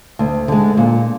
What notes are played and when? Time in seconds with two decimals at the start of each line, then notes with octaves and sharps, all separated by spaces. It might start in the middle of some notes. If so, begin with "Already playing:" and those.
0.19 D2
0.48 D3 G#3
0.77 A#2